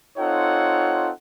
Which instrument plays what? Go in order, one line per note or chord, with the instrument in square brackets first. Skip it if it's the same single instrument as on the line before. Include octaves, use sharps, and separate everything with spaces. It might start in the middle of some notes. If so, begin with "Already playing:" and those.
[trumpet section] C4 D#4 F4 A4 C#5 F#5